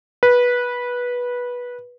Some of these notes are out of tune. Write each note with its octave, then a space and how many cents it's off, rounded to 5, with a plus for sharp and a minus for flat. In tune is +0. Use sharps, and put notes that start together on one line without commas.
B4 -15